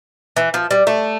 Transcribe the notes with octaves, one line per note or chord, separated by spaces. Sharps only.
E3
F3
G3
A3